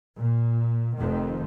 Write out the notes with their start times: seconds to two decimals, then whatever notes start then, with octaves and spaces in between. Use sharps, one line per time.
0.17 A#2
0.98 F1 F2 D#3